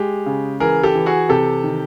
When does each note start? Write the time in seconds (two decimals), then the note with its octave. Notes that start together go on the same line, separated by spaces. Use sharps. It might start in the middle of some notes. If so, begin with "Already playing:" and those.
Already playing: G#3 G4
0.26 C#3
0.60 E3 G#4 A#4
0.83 G4 A4
0.95 E3
1.06 F#4 G#4
1.29 C3 G4 A4
1.64 D#3